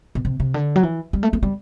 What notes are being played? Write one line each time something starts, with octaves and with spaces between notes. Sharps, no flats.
B2
C3
C3
D3
F#3
E3
G3
A3
A3
G3